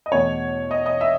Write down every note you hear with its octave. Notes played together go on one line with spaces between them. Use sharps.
D#5
E2 B2 A3 C#5
D#5
D#5
E5